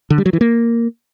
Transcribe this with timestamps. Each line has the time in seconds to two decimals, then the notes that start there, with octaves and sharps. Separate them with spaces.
0.10 D3
0.18 G3
0.26 F#3
0.33 E3
0.41 A#3